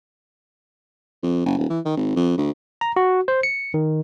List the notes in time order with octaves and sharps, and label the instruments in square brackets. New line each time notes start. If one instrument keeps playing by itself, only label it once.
[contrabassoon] F2
F#1
D#1
E3
D#3
G#1
F2
D2
[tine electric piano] A#5
F#4
C5
C#7
D#3